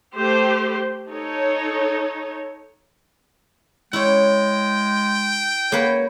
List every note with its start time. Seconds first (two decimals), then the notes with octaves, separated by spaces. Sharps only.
0.15 A3 G4 C5
1.10 D#4 A4 C#5
3.93 G#3 E4 C#5 G5
5.72 A#3 B4 C#5